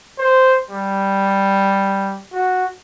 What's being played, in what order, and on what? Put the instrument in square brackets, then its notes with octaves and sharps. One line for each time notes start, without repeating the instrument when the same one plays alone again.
[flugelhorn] C5
G3
F#4